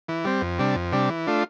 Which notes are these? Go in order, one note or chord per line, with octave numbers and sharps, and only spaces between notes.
E3
G3 C4
F2
C3 G3 D4
F2
C3 G3 D4
E3
A3 D4 F4